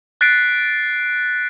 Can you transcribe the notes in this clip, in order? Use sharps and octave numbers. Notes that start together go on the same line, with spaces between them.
F#6 A6 B6 C7 D7